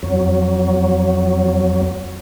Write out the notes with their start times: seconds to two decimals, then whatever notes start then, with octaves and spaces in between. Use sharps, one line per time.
0.03 F2 F#3